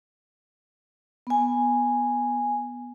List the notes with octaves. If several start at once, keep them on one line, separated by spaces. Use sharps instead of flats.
B3 G#5